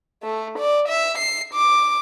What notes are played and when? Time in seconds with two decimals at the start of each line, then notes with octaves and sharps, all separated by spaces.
0.23 A3
0.58 D5
0.88 E5
1.18 C7
1.53 D6